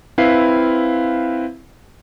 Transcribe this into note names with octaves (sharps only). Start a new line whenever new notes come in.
C4 E4 B4 F5 C7